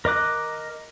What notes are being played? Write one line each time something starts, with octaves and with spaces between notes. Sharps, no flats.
A#4 D#5 D6 F#6